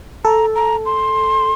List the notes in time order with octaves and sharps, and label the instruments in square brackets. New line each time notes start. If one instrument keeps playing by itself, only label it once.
[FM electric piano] A4 [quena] A#5
[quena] A#5
C6